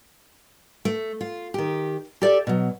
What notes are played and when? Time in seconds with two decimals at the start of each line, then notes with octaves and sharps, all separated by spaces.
0.85 A3
1.21 F4
1.54 D#3 G4
2.22 G4 A4 D5 E5
2.47 B2 F#3